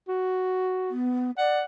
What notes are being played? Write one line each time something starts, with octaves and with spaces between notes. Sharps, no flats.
F#4
B3
D5 F#5